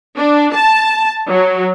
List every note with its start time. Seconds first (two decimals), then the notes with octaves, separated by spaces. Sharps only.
0.17 D4
0.54 A5
1.30 F#3